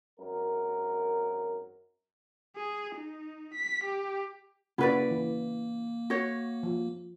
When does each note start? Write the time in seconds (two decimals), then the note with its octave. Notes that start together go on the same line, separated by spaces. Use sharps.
0.20 G#1 F#2 A#4
2.56 G#4
2.95 D#4
3.54 B6
3.84 G4
4.78 C#3 A#3 E4 F#4 B4 D5
5.11 E3
6.10 F#4 C#5
6.63 F3